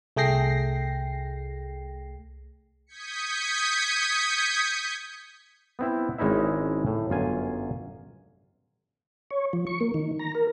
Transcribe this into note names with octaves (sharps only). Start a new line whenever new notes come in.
C2 A3 G#4 G5 A#6 C7
D#6 G6 G#6 B6 C#7
B3 C4 E4
G#1 G#3 C#4 D#4 E4 E5
A2
G1 F#2 F4 G#5
C#5
F3
C#6
A#3
D#3
A#5
A#4